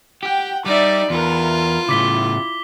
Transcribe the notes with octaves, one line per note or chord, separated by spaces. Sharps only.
G4 F#5 G5
G3 D#4 D5 E5 D6
E2 F4 A#4 B4
A2 C#3 E4 D6 B6 G7